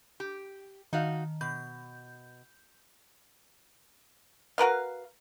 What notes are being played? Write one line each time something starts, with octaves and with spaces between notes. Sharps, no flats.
G4
D#3 D#4 F#4 F5
B2 G6
F#4 A#4 B4 F5